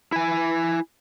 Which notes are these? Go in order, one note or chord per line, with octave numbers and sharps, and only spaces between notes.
E4 G#5